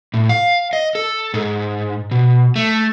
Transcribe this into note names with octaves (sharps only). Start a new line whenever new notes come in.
A2
F5
D#5
A4
G#2
B2
A3